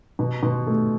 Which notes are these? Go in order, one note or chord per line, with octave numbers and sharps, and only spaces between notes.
B2
B2
A3